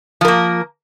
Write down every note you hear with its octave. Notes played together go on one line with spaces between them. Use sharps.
F3 A#3 A#4